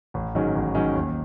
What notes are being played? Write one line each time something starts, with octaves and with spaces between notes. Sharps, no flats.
A1
G#2 D#3 F#3 C#4
A1
G#2 D#3 F#3 C#4
D#2